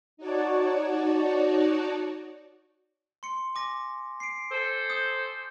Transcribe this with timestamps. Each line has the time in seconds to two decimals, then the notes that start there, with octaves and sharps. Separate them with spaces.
0.17 D#4 F#4 C#5 D5 A5
3.23 C6 C#7
3.55 G#5 D6 A#6
4.20 C7 D7
4.51 A4 C5
4.90 D#6 G6